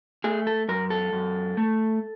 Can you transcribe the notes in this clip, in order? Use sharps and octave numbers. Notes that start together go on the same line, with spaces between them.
A3 G#4
A4
F#2 A#4
A4
F#2
A3